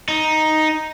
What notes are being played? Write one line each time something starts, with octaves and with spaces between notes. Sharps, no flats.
D#4